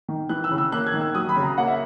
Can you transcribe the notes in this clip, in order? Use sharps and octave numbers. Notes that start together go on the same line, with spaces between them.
D#3
E3 F#6
E6
C#3
E6
A#3 F#6
G#6
D#3
E6
F#3 D#6
B5
C#3
A#5
A#3 F#5
E5